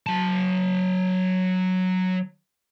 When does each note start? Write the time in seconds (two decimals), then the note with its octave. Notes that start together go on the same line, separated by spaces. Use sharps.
0.06 F#3 A5